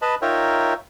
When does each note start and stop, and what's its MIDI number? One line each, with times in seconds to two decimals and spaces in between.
0.02 0.15 71
0.02 0.15 75
0.02 0.15 81
0.02 0.15 83
0.22 0.74 63
0.22 0.74 65
0.22 0.74 70
0.22 0.74 73
0.22 0.74 76
0.22 0.74 79